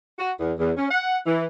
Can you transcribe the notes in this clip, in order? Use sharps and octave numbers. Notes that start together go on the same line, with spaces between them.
F#4
E2
E2
C#4
F#5
E3